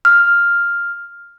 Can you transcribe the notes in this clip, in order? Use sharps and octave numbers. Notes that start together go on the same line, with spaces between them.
F6